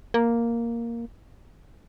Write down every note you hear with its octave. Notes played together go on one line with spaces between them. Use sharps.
A#3